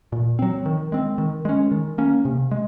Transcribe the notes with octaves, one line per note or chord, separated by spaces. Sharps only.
A#2
F#3 C4
D#3
G#3 C4
D#3
G#3 C#4
D#3
A#3 C#4
C3
G#3